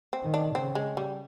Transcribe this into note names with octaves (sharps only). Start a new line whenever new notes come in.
C4
D#3
D4
C#3 C4
G#3
G3